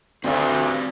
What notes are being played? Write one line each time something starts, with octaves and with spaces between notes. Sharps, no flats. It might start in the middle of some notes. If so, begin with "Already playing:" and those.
D2 G2 C4 F#4 D5